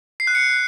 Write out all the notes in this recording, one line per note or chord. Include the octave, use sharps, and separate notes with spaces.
C7
F#6
C#7